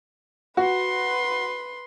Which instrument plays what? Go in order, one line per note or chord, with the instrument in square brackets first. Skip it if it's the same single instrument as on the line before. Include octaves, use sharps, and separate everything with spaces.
[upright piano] F#4 [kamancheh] B4 C6